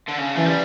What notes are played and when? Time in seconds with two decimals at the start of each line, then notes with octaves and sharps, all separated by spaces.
0.08 D3
0.18 C#3
0.36 E3 A3
0.46 G3